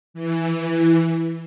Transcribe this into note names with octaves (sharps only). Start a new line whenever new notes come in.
E3